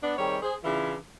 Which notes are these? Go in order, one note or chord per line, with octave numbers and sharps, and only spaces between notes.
B3 D4
D#3 G3 C4 G#4 C#5
G#4 C5
C#3 E3 D4 E4 F4